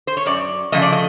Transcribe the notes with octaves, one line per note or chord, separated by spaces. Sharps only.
C5
C#5
F#2 D5
C#3 F3 A3 D#5
D5
D#5